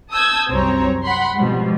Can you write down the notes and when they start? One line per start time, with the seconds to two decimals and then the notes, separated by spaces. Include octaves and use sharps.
0.11 A5 D#6 E6 G6 G#6
0.49 C2 F#2 C4 C#5 A#5
1.03 F#5 B5 C6
1.35 G#2 B2 F3 G3